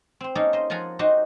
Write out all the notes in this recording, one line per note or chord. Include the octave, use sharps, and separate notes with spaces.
C4 C5
A#3 C#4 D#4 G#4 A4
C5 D#5
F3 F4 F#5 G#5 A#5
D#4 F#4 G4 C5 D#5